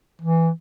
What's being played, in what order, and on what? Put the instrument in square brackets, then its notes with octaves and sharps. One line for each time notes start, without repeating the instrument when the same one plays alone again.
[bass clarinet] E3